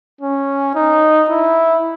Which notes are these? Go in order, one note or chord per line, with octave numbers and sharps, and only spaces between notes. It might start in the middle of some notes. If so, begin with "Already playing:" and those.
C#4
D#4
E4